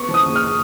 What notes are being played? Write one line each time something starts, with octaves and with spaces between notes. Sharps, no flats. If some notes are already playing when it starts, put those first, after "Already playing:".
Already playing: B3 C#6
F3
D#6
F#1
F6